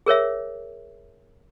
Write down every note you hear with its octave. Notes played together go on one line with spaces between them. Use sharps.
G#4 A#4 C#5 E5